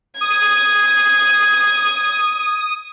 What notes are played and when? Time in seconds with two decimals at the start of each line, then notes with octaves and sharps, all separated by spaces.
0.21 D#6 G#6